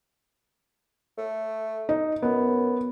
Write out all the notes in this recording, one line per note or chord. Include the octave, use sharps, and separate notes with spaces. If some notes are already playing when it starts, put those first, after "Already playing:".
A3
D#4
F#2 B3